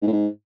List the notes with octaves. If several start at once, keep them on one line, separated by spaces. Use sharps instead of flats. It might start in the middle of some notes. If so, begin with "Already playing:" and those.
G#2
A2
G#2